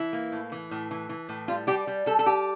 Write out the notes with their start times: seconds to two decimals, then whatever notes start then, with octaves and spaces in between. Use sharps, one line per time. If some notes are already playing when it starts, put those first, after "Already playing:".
Already playing: E3 E4
0.13 A#3
0.32 A2
0.52 E3
0.71 A2
0.91 E3
1.09 E3
1.29 A2
1.48 G3 F4
1.67 G3 G4
1.87 G3
2.06 G3 A4
2.19 A4
2.26 G3 G4